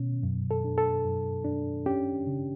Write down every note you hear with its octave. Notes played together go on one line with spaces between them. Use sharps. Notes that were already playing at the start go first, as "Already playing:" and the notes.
Already playing: B2 C#4
F#2
A4
D4
A4
F#2
D4
C#4 G4
C#3